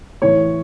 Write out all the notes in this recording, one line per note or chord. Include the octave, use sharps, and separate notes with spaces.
A2 E3 C#5